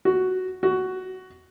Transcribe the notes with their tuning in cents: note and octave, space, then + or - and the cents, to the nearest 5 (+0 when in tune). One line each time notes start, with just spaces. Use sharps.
F#4 +5
F#4 +10